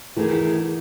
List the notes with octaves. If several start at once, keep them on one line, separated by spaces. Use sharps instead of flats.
E2 D#3 E3 A3 E4 G#4